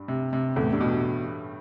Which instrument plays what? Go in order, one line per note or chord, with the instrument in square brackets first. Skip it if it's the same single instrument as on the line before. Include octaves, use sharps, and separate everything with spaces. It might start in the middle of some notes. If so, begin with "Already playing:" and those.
Already playing: [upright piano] G2 G3
[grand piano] C3
C3
[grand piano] E2 [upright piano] A2 A3
[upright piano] G2 G3
[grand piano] B2